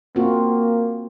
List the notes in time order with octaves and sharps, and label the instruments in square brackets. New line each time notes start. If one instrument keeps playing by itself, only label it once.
[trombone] A#3 [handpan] C4 F4 F#4